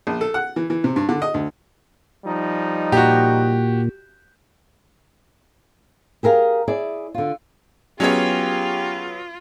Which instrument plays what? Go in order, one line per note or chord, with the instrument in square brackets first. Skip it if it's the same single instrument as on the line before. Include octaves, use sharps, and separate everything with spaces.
[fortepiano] A#1
A4
F#5
E3
E3
C3
G2
D3
D#5
D2
[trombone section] F3 G3 D#4
[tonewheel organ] A#2 [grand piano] F#4 G4
[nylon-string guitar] G4 G#4 A#4 F5
E4 G#4 D5
D3 F4
[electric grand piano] F#3 B3 [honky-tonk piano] C#4 G#4 C#5 [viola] F4 [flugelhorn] G4